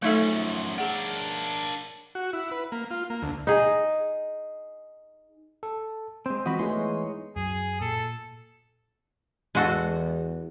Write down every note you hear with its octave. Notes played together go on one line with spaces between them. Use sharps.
F#2 F3 A3 D#4 A4 C#5 E5
D4 G#4 A#4 F#5
F#4
E4
B4
A#3
F4
A#3
D2
D#4 G#4
A4
G#3 C4 C5
E3 F3 C4 F#4 D#5 B5
E3 G#3 A3 B3 D#4 C#5 C6
F#2 F#3 G#4
A#2 A4
E2 G#3 F#4 A4